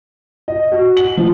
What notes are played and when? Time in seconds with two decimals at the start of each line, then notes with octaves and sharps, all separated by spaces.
0.48 D#5
0.72 F#4
0.97 F#7
1.17 F3